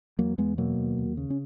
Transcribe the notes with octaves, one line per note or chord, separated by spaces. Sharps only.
E2 F#3 A#3
E2 G#3 B3
B2 F#3 A#3
D#2
D#2
C#3
C#4